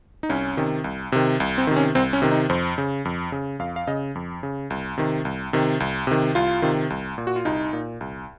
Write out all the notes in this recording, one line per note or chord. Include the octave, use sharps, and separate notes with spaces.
D#4
C2 C#4
C3 D#3
C2
C3 D#3
C2
C4
C3 D#3
C#4
C2 C4
C#4
C3 D#3
D#4
F2 C5
C#3
F2
C#3
F2 F5
F5
C#3 D#5
F2
C#3
C2
C3 D#3
C2
C3 D#3
C2
C3 D#3
C2 F4
C3 D#3
C2
A#2
F#4
F4
C2 D#4
A#2
C2